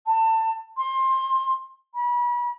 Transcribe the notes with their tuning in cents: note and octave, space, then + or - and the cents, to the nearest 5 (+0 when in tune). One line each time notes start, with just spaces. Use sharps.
A5 +25
C6 +20
B5 -35